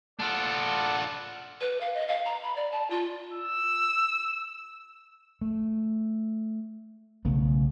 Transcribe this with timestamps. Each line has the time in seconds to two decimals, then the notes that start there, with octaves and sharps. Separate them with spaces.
0.19 D4 F4 A4 D5 F#5
1.61 B4
1.81 F5
1.94 D#5
2.08 F5
2.25 A#5
2.43 B5
2.56 D5
2.72 A5
2.90 F4
3.33 E6
5.41 A3
7.25 B1 C#3 A3 B3